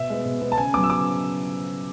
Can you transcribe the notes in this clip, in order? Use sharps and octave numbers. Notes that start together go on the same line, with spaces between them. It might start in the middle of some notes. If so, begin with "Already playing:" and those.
Already playing: B2 E5
G#3 B3
B2
G#3 B3
A5
C#3 G#5
F#3 B3 D6
E6
C#3 D6